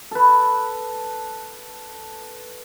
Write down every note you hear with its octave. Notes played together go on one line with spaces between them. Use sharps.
A4 B4